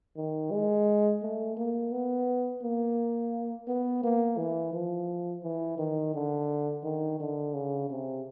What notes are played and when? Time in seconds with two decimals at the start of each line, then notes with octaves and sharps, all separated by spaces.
0.16 D#3
0.51 G#3
1.22 A3
1.57 A#3
1.92 B3
2.62 A#3
3.67 B3
4.03 A#3
4.37 E3
4.73 F3
5.43 E3
5.78 D#3
6.14 D3
6.83 D#3
7.20 D3
7.54 C#3
7.90 C3